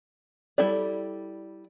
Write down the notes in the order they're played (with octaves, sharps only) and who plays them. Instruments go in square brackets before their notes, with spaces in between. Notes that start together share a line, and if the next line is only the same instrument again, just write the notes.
[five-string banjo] G3 E4 A4 D5